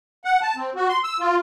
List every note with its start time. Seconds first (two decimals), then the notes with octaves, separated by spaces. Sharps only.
0.25 F#5
0.42 A5
0.56 C4
0.76 F#4
0.89 C6
1.04 E6
1.20 F4